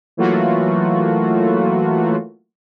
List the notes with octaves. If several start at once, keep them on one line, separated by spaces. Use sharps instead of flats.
E3 F#3 A3 A#3 F4 F#4